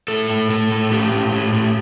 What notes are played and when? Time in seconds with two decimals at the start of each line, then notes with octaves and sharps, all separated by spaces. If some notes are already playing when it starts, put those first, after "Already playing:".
0.08 A2 A4
0.30 A2
0.50 A2 A4
0.71 A2
0.92 A2 G4
1.12 A2
1.32 A2
1.53 A2